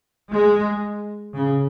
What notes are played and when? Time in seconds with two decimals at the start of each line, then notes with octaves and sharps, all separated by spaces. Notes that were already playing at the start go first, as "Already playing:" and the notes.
0.29 G#3
1.35 C#3